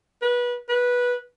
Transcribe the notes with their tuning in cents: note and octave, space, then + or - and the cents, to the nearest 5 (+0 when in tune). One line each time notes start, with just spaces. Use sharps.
B4 -25
B4 -15